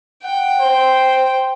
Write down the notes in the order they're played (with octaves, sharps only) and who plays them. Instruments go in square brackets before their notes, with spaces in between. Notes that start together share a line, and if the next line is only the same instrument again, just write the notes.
[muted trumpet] F#5 [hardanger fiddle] G5
[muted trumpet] C5